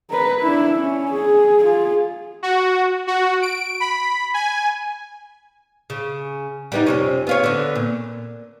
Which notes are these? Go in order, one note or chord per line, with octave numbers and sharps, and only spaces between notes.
A#4 B4
D4 E4
C#4
G#4
F4 G#4
F#4
F#4
D7
B5
G#5
C#3
G3 B3 D#4
F2 C3 C#4
B3 F4 C#5
D3 B3
A#2